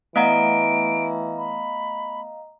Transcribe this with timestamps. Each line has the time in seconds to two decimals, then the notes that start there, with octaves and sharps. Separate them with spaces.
0.16 E3 A3 B3 D#5 F5 F#5 A#5 D7
1.38 B5